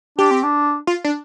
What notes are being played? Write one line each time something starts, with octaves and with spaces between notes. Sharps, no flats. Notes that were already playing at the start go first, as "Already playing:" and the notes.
D4 G4
C4
D4
F4
D4